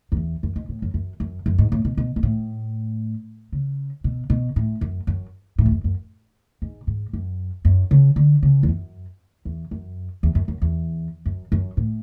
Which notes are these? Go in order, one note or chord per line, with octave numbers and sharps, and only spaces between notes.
F#2
E2
F#2
G#2
A2
F#2
F#2
F#2
F#2
G#2
A2
B2
B2
G#2
A2
C#3
B2
B2
A2
F#2
F#2
A2
E2
F#2
F#2
G#2
G#2
F#2
F#2
C#3
D3
C#3
E2
F#2
E2
F#2
E2
F#2
F#2
E2
F#2
F#2
A2